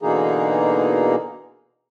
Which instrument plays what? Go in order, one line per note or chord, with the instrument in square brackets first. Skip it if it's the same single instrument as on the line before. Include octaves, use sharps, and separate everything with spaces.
[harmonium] B2 D3 E3 A#3 D#4 G#4